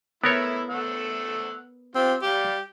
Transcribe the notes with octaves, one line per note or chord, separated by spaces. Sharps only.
A3 B3 E4 A#4 C#5 E6
A3 F#5 E6
C4 F4 G4
G3 G4 F5